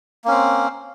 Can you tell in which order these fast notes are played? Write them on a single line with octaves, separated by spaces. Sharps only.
A#3 C#4 C4